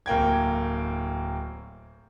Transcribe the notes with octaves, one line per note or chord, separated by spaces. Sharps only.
D1 A#3 G5 G#6